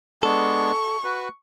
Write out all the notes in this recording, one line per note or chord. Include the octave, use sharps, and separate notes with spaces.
G#3 B3 D4 A4 C#6
F#4 B4